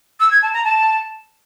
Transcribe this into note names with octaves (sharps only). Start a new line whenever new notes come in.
E6
G#6
A5
A#5
A5